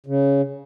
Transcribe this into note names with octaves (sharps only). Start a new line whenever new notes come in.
C#3